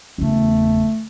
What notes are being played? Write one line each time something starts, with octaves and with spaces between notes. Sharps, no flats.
F#1 E2 A3